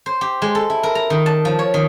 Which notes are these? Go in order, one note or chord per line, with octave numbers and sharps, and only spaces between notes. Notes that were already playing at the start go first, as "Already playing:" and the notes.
C5
G4
G#3
A4
E4
A#4
A#5
D#3
A5
F3
C#5
D#3